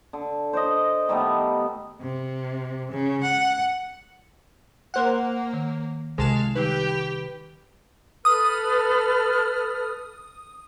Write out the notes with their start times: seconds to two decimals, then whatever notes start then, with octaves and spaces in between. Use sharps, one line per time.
0.13 D3
0.53 C5 D5 D#5
1.09 D#3 G3 A3 B3
2.02 C3
2.92 C#3
3.23 F#5
4.94 A#3 A#4 C5 F#5
5.53 D#3
6.18 C2 C3 G#3 F5 A5 E7
6.55 D#3 G3 D#4 G4 B4 G5
8.25 A4 B4 D#6 F6